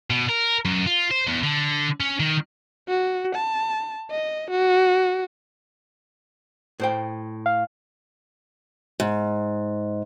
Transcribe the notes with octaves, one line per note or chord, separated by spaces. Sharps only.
B2
A#4
F#2
F4
C5
E2
D3
C#4
D#3
F#4
A5
D#5
F#4
A2 C5 G5
F5
G#2